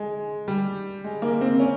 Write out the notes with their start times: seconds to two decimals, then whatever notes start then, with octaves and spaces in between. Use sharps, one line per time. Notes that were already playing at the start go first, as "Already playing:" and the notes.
Already playing: G#3
0.48 G3
1.04 G#3
1.22 A#3
1.41 C4
1.60 C#4